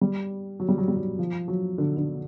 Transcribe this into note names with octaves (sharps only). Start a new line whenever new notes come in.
G3
F#3
G3
F#3
G3
F#3
F3
F#3
D3
D3